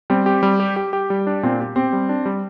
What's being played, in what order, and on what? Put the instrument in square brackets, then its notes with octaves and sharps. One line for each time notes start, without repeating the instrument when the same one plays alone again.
[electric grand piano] G3 [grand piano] C4
[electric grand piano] G4
G3
G4
G4
G4
G3
D4
[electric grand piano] A#2 [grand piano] C4
[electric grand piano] G4
[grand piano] C4 [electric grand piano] G4
[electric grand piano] G3
D4
G3